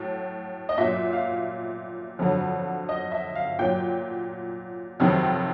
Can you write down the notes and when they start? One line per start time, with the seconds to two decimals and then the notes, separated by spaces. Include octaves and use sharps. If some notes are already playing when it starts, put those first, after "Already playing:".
Already playing: A2 F#3
0.69 D#5
0.78 A#2 F#3 E5
1.13 F5
2.19 F2 D3 F#3
2.89 D#5
3.12 E5
3.35 F5
3.59 A#2 F#3 G5
5.00 F2 C3 D#3 F#3